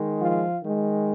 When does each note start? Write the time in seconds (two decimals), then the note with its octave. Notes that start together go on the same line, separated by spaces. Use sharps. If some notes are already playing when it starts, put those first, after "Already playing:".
Already playing: D#3 G#3
0.20 F3 F4
0.61 D#3 G#3